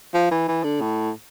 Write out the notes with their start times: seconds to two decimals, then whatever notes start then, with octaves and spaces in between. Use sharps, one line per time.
0.14 F3
0.31 E3
0.48 E3
0.64 D3
0.81 A2